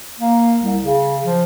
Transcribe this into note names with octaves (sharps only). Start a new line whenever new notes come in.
A#3
C2
C#3
F3